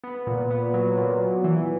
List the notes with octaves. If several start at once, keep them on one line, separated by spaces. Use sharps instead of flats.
B3
A#2
B3
F#3
A#2
A#2
E3